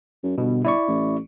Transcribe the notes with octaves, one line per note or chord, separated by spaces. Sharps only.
F#2
G1 B2
E4 D5 C#6
A1